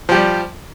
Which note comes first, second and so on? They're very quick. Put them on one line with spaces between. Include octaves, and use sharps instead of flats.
F3 G4 G3